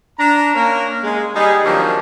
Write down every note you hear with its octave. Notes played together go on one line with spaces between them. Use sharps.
D4 A#5
A#3 C#4 A#4
G#3
G3 D#4 G#4
D#3 F3 F#3 A#3 C4 D4